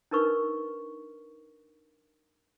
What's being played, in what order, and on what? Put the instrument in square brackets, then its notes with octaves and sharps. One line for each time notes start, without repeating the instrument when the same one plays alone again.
[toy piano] D4 D#4 A#4 B4 C#6